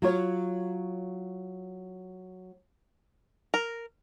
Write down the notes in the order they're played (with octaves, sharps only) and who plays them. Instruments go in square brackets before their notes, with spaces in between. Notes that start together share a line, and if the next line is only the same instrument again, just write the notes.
[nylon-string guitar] F#3 F4 C#5
[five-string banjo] A#4